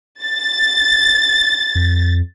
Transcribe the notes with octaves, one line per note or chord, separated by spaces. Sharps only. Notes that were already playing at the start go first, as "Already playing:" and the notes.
A6
F2